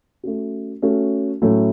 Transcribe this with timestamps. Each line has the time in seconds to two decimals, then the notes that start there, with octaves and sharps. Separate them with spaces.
0.23 A3 C#4 F#4
0.82 A3 C#4 F#4
1.42 A2 F#3 A3 C#4